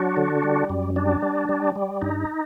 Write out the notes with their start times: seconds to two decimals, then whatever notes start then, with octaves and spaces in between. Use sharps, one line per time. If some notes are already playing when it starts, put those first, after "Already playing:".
Already playing: F#3 D4 F#4
0.17 D3
0.43 G3
0.70 F#2
0.96 G3 D4
1.22 G3
1.49 G3
1.76 G3
2.02 G2 D#4